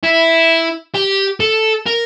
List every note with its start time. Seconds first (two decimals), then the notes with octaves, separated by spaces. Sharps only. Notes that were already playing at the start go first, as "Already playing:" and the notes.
0.03 E4
0.95 G4
1.40 A4
1.87 A#4